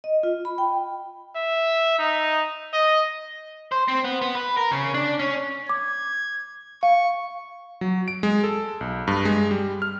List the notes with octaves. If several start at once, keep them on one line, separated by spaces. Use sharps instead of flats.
D#5
F4
B5
G5
E5
D#4
D#5
C5
C4
B3
B3
B4
A#4
C#3
D4
C#4
D6 G#6
F5 C#6
F#3
D7
G#3
A4
B1
G2
G#3
G3
F6